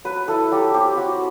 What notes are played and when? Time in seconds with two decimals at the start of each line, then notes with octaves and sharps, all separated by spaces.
0.05 F#3 B4
0.28 E4 A4
0.52 F#3 G4
0.74 C4 G4
0.97 F#3 F#4